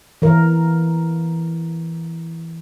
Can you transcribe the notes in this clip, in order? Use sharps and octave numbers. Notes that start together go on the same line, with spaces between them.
E3 A#4